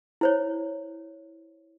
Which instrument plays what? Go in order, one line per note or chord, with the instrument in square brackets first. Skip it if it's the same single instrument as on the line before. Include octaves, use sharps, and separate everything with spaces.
[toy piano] E4 C5 C#5